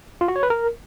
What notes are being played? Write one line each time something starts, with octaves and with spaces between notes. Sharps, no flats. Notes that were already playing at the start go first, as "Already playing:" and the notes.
F4
F#4
C#5
B4
A#4